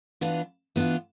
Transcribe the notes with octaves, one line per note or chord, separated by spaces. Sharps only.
E3 B3 D4 F4
E3 B3 D4 F4